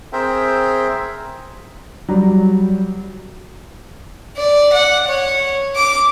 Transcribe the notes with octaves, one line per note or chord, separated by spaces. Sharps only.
C4 G#4 A#4 C5 E5 G5
F#3 G3
D5
F#5
C#5
D6